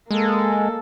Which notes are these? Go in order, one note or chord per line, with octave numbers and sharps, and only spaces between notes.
G#3 A#3 A4